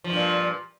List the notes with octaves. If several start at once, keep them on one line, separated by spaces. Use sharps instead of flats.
G2 A#2 F3